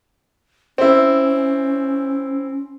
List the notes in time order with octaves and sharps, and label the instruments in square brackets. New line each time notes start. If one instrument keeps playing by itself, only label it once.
[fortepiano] C4 E4 [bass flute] C#4